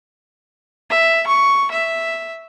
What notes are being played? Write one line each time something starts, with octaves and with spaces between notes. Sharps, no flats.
E5
C#6
E5